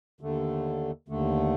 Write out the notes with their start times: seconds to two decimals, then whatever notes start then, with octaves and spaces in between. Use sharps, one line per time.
0.21 D#2 D3 A3
1.09 D#2 D3 A3